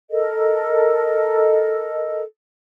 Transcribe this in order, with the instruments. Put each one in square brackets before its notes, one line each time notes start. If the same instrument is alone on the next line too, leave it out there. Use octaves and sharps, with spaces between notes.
[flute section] A4 A#4 D#5